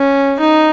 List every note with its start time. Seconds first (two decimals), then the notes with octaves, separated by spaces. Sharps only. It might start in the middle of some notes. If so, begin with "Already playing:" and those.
Already playing: C#4
0.40 D#4